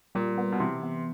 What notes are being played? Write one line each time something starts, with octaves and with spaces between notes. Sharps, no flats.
A#2 G3
B3
B2
C3 E3
B3